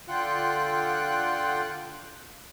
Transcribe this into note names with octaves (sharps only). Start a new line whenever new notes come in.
D3 F4 F#5 G5 C6 F#6